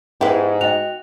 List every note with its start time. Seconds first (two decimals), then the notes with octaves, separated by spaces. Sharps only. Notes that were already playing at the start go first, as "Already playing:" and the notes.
0.21 G#2 B3 E4 G4 G#4
0.61 F#4 D#5 G5 F7